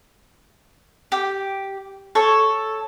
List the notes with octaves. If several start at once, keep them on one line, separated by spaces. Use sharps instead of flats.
G4
A4 C#5 C#6